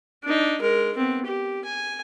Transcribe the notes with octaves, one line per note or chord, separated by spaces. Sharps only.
D4 D#4
G#3 A#4
B3 C4
G4
G#5